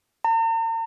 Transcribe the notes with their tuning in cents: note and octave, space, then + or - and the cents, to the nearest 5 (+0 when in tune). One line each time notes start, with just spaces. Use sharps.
A#5 -45